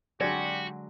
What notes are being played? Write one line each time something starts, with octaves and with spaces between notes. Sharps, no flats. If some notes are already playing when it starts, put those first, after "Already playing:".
D3 F#3 G#3 F#4 G4 D5